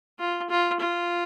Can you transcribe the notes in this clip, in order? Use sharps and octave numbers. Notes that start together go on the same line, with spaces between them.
F4
F4
F4